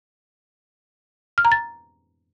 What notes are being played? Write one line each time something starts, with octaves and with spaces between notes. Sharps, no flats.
F6
A#5
A6